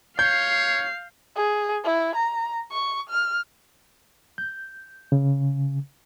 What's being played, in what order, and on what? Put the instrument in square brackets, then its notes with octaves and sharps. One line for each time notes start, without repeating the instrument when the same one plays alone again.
[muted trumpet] C#5 [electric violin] F5 C7 [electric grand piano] G6
[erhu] G#4
E4
A#5
C#6
F6
[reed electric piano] G6
C#3